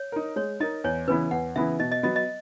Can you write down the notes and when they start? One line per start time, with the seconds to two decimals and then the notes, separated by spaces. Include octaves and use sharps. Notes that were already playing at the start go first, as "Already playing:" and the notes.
Already playing: C#5
0.12 D#4 A#4
0.36 G#3 C#5
0.60 D#4 A#4 D#5
0.84 E2 C#5
1.08 C#3 E3 B3 E4 B4
1.31 E2 F#5
1.56 C#3 E3 B3 E4 E5
1.79 B2 D#5
1.92 D#5
2.03 F#3 B3 D#5
2.16 D#5